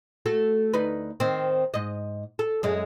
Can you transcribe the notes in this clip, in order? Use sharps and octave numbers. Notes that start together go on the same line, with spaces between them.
A3 F#4 A4
D2 D#4 B4
D#3 C4
G#2 D#5
A4
F#2 G#3